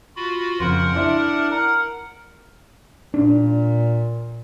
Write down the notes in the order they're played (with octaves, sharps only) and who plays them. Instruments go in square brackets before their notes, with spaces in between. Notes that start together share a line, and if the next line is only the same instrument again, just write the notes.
[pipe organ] F4 F#4 B5
[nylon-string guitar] F2 C#3 [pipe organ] A#4 F#5 [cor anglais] C5
[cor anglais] D4 [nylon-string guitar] E4 E5
[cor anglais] A#4 [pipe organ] F#5
[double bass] A#2 [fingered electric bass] D4